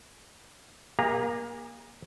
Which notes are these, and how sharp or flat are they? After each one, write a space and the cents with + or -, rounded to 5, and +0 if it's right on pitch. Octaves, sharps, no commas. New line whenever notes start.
A#3 +25 G#4 -35 A#5 +0